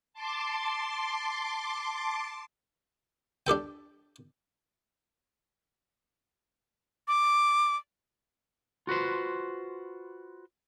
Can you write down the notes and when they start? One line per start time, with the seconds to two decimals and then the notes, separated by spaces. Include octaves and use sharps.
0.13 A5 C6 D6
3.47 D4 G4 A4 G5
7.08 D6
8.87 F4 F#4 B4 C5